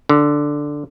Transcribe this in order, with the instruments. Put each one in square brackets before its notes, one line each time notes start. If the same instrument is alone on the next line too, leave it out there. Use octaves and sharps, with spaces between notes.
[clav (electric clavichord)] D3